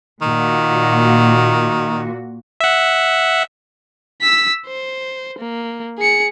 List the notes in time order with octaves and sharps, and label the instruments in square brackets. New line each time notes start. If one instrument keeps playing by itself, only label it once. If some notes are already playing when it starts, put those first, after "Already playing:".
[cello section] A#2 F#4 [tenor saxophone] D#3
[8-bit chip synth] E5 F#5
[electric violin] E6 B6
C5
A#3
G#4 C#7